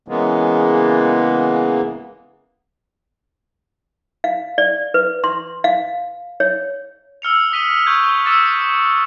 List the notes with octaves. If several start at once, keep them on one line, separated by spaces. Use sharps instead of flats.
C#3 E3 G#3 A#3 B3
F5
D5
B4
C6
F5
C#5
E6 F6 C#7 F7
D#6 B6 D#7 G7
C#6 G6 G#6
D6 E6 F#6 A6 C#7 G7